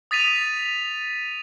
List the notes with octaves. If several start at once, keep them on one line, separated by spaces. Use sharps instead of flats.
D#6 A6 B6 D#7 F7